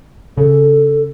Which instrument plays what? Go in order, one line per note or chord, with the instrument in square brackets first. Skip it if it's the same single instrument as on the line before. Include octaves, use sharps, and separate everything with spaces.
[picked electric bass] C#3 [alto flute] A4